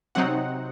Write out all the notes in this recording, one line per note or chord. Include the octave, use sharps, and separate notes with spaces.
C3 F#3 C4 D#4 F#5